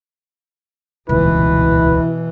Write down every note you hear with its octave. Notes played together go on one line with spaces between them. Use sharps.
D#1 C#2 B2 E3 E4 B4